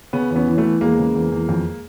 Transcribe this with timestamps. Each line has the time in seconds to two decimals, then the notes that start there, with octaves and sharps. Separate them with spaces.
0.13 C#3 B3 C#4
0.30 E2
0.36 B3 C#4
0.48 E3
0.58 A3 B3
0.64 E3
0.81 E2 G#3 A#3
0.99 C#3
1.15 E2
1.32 E2
1.49 F2